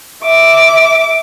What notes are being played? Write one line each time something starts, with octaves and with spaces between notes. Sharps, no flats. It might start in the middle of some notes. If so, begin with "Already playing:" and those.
E5 D6